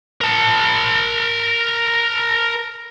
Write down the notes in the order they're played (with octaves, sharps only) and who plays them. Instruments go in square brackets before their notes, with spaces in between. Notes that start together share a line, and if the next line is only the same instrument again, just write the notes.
[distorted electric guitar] A#4 A5